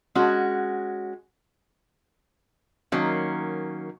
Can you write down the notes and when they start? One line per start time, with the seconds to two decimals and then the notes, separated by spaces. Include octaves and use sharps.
0.15 G#3 C#4 F#4
2.92 D#3 F#3 A#3 C#4